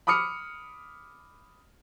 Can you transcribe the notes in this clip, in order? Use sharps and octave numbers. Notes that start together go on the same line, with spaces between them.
B5 D6 D#6 F6 C#7